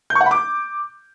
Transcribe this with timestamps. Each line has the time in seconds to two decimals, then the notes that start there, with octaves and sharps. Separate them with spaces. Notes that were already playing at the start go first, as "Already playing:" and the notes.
0.10 G6
0.15 C#6
0.21 F#5
0.26 B5
0.31 D6